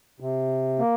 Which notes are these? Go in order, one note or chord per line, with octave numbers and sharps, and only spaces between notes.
C3
A#3